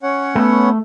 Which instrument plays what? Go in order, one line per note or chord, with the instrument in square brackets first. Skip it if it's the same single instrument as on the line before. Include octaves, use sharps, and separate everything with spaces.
[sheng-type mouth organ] C#4 C#5 F#5
[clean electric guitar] A3 [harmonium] B3